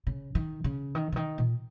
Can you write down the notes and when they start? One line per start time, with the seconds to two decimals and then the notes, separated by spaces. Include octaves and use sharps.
0.07 C#3
0.35 D#3
0.64 C#3
0.95 D#3
1.12 C#3
1.16 D#3
1.38 A#2